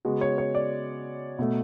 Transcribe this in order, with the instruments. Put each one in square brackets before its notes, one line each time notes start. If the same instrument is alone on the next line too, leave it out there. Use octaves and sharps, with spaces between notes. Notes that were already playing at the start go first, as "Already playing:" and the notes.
[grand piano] C#3 G#3 B3 F#4
C#5
C#5
D5
B2 A3